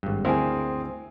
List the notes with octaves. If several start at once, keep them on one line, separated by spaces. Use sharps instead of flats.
G#1 G2
D2 C4 E4 G#4 A#4 G#5